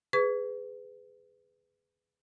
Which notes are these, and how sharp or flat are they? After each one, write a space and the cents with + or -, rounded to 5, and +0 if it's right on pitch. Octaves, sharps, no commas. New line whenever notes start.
G#4 +0 B4 +20 C#6 +40